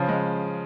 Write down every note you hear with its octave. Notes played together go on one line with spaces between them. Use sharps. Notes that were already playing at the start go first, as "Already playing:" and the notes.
Already playing: C#3 F3
G#3